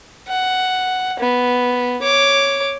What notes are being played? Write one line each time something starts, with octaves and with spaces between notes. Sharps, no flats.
F#5
B3
C#5 D6